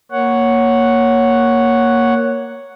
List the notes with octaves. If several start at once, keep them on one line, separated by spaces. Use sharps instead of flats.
A#3 C#5 F#5